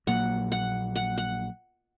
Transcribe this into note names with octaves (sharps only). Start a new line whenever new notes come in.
A#1 A#2 F#3 A#3 F#5
F#5
F#5
F#5